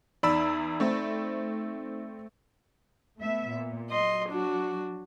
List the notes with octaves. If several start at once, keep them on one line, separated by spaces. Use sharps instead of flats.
E2 D#4 D5 B5 E6
A3 C4
A3 B3 E5
A#2
F#3 D#5 C6
D4 F#4